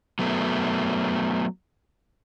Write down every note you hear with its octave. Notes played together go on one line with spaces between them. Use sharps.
F#3 A3 B3